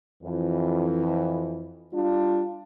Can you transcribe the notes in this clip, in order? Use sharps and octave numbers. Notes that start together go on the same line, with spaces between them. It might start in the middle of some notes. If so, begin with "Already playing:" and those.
F2 E3
G3 D4 F4